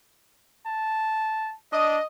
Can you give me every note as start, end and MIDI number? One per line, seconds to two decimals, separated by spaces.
0.67 1.55 81
1.72 1.98 62
1.72 2.03 75